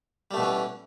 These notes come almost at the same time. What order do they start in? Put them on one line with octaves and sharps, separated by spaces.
G3 A3 B2 E3 C#4